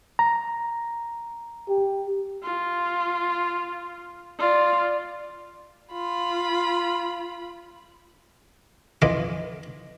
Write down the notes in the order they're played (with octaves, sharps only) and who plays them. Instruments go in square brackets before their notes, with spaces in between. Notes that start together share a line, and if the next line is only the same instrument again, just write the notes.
[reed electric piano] A#5
[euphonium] G4
[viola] F4
F4 D5
[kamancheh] F4 B5
[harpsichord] F2 E3 F4 D#5 F5 D6